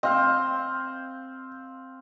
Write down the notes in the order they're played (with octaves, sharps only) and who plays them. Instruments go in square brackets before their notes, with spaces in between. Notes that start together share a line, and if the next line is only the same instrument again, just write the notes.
[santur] C4 [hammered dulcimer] C5 F5 G5 [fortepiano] D#5